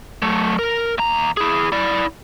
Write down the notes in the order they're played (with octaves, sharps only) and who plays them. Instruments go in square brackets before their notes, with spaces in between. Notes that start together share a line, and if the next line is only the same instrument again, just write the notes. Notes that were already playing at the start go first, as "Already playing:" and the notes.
[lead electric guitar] F#3 A3
A#4
D#2 A#5
E4 G#4
E4 D5